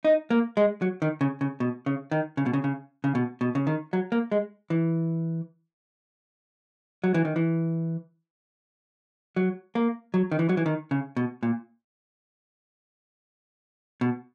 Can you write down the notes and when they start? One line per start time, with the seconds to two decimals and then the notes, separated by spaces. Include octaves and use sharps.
0.05 D#4
0.30 A#3
0.57 G#3
0.82 F#3
1.02 D#3
1.21 C#3
1.41 C#3
1.60 B2
1.86 C#3
2.11 D#3
2.37 C#3
2.46 B2
2.53 C#3
2.64 C#3
3.04 C#3
3.15 B2
3.41 B2
3.55 C#3
3.67 D#3
3.93 F#3
4.12 A#3
4.32 G#3
4.70 E3
7.04 F#3
7.14 E3
7.25 D#3
7.36 E3
9.36 F#3
9.75 A#3
10.14 F#3
10.31 D#3
10.39 E3
10.49 F#3
10.57 E3
10.66 D#3
10.91 C#3
11.17 B2
11.43 A#2
14.01 B2